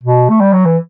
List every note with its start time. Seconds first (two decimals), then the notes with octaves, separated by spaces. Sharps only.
0.03 B2
0.29 A3
0.41 G3
0.53 F#3
0.66 E3